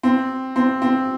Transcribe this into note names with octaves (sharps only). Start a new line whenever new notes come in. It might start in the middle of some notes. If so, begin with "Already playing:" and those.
C4
C4
C4